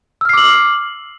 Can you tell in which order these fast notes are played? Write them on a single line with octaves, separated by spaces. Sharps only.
E6 F6 C7 D6 F#7